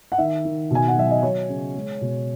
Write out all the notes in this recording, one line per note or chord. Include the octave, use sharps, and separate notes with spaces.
F#5
D#3 E5
D#3
B2 G#5
F#5
F#3 E5
D#5
F#3 C#5
C#3
G#3
B2